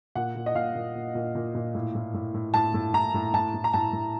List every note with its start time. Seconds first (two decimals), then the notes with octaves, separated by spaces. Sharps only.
0.15 A#2 F#5
0.35 A#2
0.46 D#5
0.55 A#2 F5
0.75 A#2
0.95 A#2
1.15 A#2
1.35 A#2
1.55 A#2
1.75 A2
1.95 A2
2.14 A2
2.34 A2
2.54 A2 A5
2.74 A2
2.94 A2 A#5
3.14 A2
3.34 A2 A5
3.54 A2
3.64 A#5
3.73 A2 A5
3.93 A2